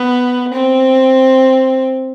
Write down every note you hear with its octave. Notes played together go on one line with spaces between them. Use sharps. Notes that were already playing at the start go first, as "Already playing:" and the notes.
Already playing: B3
C4